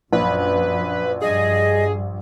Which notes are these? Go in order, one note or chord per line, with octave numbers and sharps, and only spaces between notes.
A#1 F#2 B4
G2 G#4 D#5